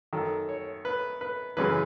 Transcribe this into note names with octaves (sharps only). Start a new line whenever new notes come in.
F#2 D#3 A4
C#5
B4
B4
F#2 C#3 E3 B4